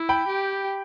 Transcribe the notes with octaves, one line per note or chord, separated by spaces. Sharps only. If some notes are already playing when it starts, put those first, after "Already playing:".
Already playing: E4
G5 B5
G4